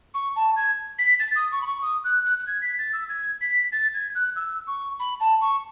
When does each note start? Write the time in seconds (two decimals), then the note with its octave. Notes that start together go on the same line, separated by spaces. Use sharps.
0.14 C#6
0.36 A5
0.56 G#6
0.99 B6
1.20 A6
1.36 D#6
1.52 C#6
1.62 B5
1.67 C#6
1.83 D#6
2.04 F#6
2.25 F#6
2.38 F#6
2.47 G#6
2.62 B6
2.79 A6
2.93 E6
3.09 G#6
3.41 B6
3.72 A6
3.94 G#6
4.15 F#6
4.36 E6
4.67 C#6
5.00 B5
5.20 A5
5.41 C#6